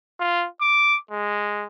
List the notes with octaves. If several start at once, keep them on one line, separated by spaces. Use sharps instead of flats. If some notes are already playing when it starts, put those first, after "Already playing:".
F4
D6
G#3